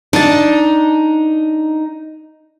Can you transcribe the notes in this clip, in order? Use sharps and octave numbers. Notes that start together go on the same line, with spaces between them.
D4 D#4 A5